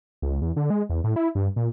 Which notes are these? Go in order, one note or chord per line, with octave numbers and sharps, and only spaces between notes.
C#2
E2
D3
G#3
E2
A2
E4
G2
A#2